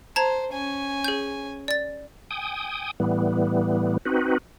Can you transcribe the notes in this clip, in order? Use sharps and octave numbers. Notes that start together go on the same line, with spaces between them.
C5 A5 A#5 G#6
C#4 G#5
G#4 G6
D5 A6
G5 G#5 D#6
A2 E3 G3 B3
C4 D#4 F#4 B4